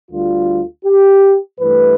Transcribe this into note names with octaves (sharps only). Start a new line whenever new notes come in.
D2 D3 G3 F4
G4
G2 E3 A3 B4